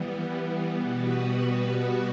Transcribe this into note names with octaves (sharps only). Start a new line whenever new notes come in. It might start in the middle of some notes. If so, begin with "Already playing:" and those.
Already playing: E3 G3 B3
B2 G3 B3 F#4 B4